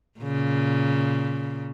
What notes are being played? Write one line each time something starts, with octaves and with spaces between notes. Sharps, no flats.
A#2 C#3